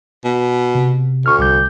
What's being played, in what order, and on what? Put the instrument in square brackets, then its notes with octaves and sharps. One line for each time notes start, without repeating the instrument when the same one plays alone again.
[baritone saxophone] B2
[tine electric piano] C3
[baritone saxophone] D2 [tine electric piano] C#6 F6
[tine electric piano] C2 D6 G6